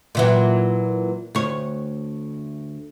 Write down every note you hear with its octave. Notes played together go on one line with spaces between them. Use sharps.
A#2 E3 F#3
D2 C#5